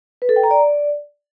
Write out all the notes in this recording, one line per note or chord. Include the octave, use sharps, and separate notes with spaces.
B4
A4
G5
A#5
D5